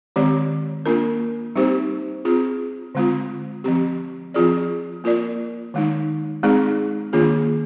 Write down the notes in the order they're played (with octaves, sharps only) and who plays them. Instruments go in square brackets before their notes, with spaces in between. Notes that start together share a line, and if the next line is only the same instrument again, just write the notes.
[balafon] D#3 G#3 C4 G4 D5
A#3 D4 F4 A#4
G3 C4 D#4 G4 C5
C4 F4 G#4
D3 G#3 C4 F4
F3 C4 G4
F3 C4 F4 G#4 D5
A#3 F4 A#4 D5
D#3 G#3 D#4
G#3 C4 D#4 G#4 D5
D#3 A#3 D4 F4 G#4